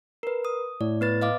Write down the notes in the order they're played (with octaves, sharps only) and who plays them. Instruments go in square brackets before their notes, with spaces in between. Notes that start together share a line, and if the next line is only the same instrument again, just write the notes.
[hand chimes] A#4 B4
D#6
[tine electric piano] A2 [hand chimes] D5
[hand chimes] B3 B4 A6
D#5 F5 D6